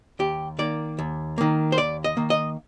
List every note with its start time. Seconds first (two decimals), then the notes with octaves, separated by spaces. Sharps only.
0.19 D#2 G4
0.59 D#3 A#3 D5
0.99 D#2
1.38 D#3 A#3
1.72 C5
1.78 D#2 D5
2.04 D#5
2.17 D#3 A#3
2.30 D#5